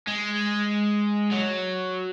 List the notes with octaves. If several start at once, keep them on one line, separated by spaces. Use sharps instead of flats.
G#3
F#3